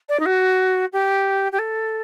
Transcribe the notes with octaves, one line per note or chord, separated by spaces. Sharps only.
D5
D#4
F#4
G4
G4
A4